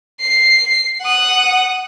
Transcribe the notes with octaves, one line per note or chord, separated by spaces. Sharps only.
C7
F#5 D#6